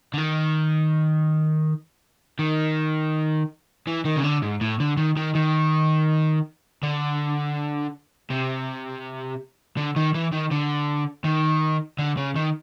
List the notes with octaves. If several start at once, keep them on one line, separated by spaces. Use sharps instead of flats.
D3
D#3
D#3
E3
D#3
C#3
D3
G#2
A2
D3
D#3
D#3
D#3
D3
C3
D3
D#3
E3
D#3
D3
D#3
D3
C#3
D#3